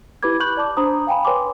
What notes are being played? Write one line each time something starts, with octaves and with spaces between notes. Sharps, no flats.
E4 G4 B4 B5 D6 G#6
B5 C#6 F#6 G6 F#7
D5 A5 D6
D4 C5 A#5 B5 D#6
F5 G5 G#5 B5
B4 C#5 G5 G#5 C6 D6